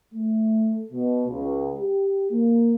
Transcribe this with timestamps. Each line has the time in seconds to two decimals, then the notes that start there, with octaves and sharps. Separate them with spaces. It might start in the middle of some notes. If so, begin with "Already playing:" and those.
0.14 A3
0.92 B2
1.28 C#2
1.80 G4
2.31 A#3